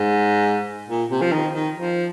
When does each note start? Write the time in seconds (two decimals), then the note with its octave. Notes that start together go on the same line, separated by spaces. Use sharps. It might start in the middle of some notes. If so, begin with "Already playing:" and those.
Already playing: G#2
0.89 A#2
1.11 C3
1.22 F3
1.32 D#3
1.53 D#3
1.76 F3